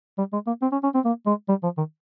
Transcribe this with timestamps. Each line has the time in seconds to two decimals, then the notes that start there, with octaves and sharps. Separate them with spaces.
0.18 G3
0.33 G#3
0.47 A#3
0.62 C4
0.72 C#4
0.83 C#4
0.95 C4
1.05 A#3
1.27 G#3
1.49 G3
1.63 F3
1.77 D#3